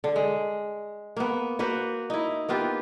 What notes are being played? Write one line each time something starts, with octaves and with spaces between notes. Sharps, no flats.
D3
G#3
A#3 B3
A#3 F#4 B4 C5
D#4 E4
A#3 B3 F4 G4